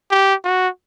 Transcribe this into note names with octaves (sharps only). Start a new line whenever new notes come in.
G4
F#4